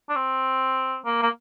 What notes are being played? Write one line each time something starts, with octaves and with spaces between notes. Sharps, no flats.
D4
C4
A#3
A#3